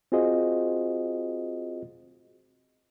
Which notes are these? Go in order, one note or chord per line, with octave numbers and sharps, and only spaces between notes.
C4 F4 F#4 G#4 C5 D#5